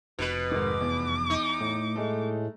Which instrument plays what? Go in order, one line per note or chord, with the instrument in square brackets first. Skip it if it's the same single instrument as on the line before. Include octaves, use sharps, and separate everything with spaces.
[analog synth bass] F1 [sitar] B2 B4
[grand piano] G#2 D#3 [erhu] D6
[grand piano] E2
[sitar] D#4
[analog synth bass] A2
[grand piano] G#3 A3